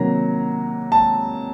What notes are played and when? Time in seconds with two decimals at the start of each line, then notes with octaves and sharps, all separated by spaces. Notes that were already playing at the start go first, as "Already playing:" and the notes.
Already playing: C3 D#3 F#3 A#3 A#5
0.92 A5